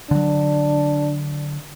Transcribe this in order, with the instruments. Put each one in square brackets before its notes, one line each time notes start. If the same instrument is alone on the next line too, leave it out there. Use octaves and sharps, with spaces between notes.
[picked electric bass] D3 F#3 [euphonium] D4